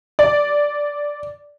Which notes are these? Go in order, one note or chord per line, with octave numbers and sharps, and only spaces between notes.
D5